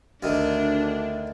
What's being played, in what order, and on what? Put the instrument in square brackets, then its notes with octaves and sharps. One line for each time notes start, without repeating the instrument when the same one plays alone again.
[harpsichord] D2 D#3 [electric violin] D4